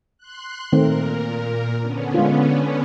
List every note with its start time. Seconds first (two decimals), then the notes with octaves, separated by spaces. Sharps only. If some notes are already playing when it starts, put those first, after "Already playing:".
0.18 C6 F#6
0.73 A#2 D#3 A3 C4 A#4
1.80 D3 B3 C#4
2.14 G#3 D4 F4